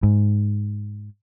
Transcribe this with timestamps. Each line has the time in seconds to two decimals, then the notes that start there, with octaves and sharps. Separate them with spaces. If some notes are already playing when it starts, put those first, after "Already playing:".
0.03 G#2